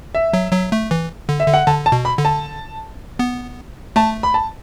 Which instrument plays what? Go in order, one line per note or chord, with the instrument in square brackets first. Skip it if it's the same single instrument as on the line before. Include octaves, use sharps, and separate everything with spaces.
[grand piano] E5
[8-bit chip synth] F#3
F#3
A3
E3
D3
[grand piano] E5
[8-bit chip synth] D3
[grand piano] F#5
[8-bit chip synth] D3 [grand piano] A5
[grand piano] A5
[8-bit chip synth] B2
[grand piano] B5
[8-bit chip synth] D3
[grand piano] A5
[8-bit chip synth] B3
[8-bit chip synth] A3 [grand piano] A5
[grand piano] B5
A5